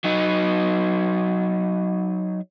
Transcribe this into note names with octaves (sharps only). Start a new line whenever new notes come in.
F#3 D#4